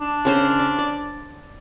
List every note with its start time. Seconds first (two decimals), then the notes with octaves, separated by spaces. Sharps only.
0.01 D4
0.25 C#3 C#4 C5
0.59 D5
0.78 D5